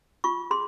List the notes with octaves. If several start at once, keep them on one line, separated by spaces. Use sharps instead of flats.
F4 C#6
G#4 C6